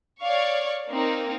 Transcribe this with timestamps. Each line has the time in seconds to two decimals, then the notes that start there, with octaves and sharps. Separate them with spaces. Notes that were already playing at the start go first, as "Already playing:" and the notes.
0.21 C#5 D5 F5 C#6
0.90 A#3 C4 D#4